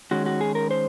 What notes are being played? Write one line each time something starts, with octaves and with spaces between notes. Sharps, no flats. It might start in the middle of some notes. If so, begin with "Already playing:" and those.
D#3 G#3 C#4 F#4
F#4
G#4
A#4
C5